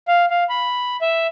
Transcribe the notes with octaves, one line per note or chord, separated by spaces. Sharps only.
F5
F5
B5
E5